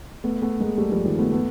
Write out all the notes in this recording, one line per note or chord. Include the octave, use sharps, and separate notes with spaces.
A3 B3
A3 B3
G#3 A#3
G3 A3
F3 G3
D#3 F3
A3 B3
A3 B3